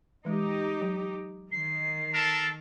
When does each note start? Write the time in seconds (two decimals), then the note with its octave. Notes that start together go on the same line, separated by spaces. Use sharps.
0.25 E3 G#3 D#4 G4 D#5
0.82 F#3
1.51 D#3 C7
2.14 A4 A#4 A5